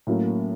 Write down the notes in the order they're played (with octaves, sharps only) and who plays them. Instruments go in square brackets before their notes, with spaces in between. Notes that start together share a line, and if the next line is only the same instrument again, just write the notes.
[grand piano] A2 F#3 A#3 C#4